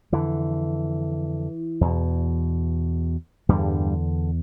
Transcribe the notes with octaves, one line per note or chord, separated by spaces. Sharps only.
F2 D3 E3
E2 B2
E2 G2 D3 G3